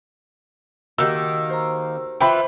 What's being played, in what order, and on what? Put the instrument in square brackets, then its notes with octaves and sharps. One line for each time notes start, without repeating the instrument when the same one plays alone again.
[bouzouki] D#3 A#3 [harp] F#4 G4 [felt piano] E6
[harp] C5 A#5
[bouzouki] E3 E4 F4 [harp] C5 [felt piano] G5 B5